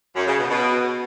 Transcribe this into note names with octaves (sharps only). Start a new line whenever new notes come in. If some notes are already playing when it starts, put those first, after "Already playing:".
F#2
C#3
B2
B2